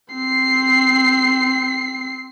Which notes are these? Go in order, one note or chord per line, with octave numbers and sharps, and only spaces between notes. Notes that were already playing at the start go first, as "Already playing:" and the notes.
C4 C7